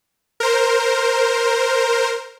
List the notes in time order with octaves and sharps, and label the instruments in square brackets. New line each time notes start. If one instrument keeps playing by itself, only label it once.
[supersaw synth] A#4 C5